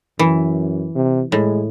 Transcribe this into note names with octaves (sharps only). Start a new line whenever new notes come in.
F#2 E3
C3
A2 G#3